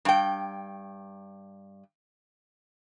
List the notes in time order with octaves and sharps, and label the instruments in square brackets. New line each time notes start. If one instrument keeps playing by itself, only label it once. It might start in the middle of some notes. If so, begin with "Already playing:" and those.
[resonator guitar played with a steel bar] G2 G5